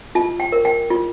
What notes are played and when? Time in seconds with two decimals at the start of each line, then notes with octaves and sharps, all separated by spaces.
0.15 F4 A5
0.40 G5
0.52 A#4
0.65 G5
0.90 F4